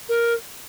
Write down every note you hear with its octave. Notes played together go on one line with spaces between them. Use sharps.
A#4